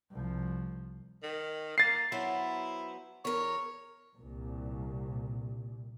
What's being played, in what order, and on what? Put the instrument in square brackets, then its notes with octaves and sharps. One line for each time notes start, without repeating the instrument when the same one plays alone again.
[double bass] C2 F3
[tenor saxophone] D#3
[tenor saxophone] A#3 [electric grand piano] A6 C7
[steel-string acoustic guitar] F#3 B3 C5 [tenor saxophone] E4
[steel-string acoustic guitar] E2 A#4 [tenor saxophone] C#5
[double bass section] C2 A#2